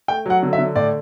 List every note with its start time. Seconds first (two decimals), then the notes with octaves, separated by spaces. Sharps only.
0.08 A3 G5
0.26 F#3 F#5
0.43 D3
0.53 E5
0.58 D3
0.76 A2 D5